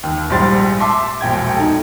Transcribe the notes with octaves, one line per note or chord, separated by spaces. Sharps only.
D#2
A#1 G#2 G3 C6 A6
E5 A5 C6 D6
E1 A#1 G5 G#6
D#4 A4